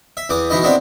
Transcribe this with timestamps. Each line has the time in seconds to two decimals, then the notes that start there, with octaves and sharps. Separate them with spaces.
0.17 E5
0.29 E2 E3 D6 D#6
0.50 B2 E3 D#4 E4 D#5
0.63 G#3 B3 C4 D4 E4